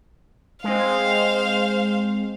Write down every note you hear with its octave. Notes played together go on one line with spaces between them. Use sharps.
G#3 C4 C5 F5